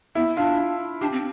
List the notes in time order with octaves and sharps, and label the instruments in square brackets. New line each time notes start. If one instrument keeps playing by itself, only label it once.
[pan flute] B3 [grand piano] E4
[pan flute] D4 [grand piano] F4
[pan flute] D4 [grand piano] G4
[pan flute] C4